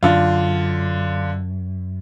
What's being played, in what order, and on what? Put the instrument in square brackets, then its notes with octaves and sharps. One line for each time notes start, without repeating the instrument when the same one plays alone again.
[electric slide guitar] F#2 [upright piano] D3 F4